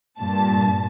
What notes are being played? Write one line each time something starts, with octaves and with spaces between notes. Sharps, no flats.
G2 A#2 A5